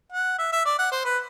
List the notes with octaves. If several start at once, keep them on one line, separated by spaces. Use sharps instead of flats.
F#5
E5
E5
D5
F#5
C5
B4